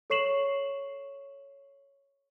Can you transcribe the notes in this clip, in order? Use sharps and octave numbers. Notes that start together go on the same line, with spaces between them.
A4 C#5 C#6 C7 E7 F#7